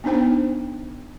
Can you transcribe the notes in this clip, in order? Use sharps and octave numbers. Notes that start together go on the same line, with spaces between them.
B3 D4 D#4 C5 G5